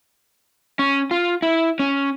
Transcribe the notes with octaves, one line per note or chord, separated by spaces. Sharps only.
C#4
F4
E4
C#4